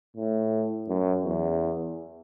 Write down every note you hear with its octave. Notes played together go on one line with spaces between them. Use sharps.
A2
F#2
E2